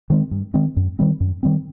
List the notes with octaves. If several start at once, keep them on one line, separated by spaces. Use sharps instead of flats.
D#3 G#3 C4
G2
D#3 G#3 C4
F#2
D#3 G3 C4
F#2
D#3 G3 C4